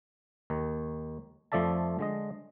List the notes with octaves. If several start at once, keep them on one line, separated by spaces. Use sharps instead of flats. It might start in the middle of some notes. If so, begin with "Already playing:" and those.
D#2 D#3
F2 F3 A3 D5 E5 A5
D3 G#3 D#5